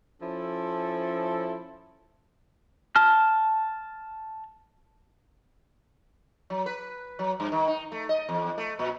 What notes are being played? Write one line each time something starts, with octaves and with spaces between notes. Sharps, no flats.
F3 C#4 E4 A4
A5 F6
F#3
B4
F#3
G2
D#3
D#4
A3
D#5
E2
A3
A#2